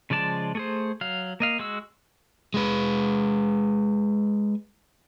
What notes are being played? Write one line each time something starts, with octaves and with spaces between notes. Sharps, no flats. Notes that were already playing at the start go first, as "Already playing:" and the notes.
C#3 F3 G#3 D5 A5
A3 G#4 C5
F#3 F5
A#3 D#5 F5
G#3 F#4 E6
G#3 B4